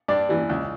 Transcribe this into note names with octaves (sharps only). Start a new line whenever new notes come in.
G2 D4 D5
E3 G3
C#2